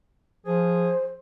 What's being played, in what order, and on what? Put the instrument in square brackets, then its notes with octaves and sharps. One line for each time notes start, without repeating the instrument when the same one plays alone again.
[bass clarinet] F3 [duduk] G#4 [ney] C5